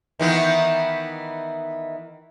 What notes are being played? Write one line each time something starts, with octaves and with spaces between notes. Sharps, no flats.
D#3 E3 B3